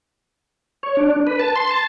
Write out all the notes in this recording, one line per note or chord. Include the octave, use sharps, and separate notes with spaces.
C#5
D4
B4
A5
C6
A5